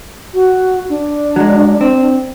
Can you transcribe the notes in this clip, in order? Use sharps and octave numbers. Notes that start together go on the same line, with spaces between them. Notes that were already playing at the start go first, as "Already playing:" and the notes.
F#4
D4
F#3 G#3
C4